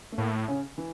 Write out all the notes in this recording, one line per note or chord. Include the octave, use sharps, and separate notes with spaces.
A3
A2 A#3
C#3 C#4
E3 E4